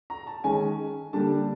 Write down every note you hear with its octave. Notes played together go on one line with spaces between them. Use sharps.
A#5
A5
D#3 G#3 C#4 G#5
D3 G3 A#3 D4 A5